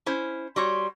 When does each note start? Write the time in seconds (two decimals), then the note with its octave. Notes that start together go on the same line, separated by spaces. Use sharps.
0.06 C#4 E4 C5
0.56 G3 F#4 C#5 C6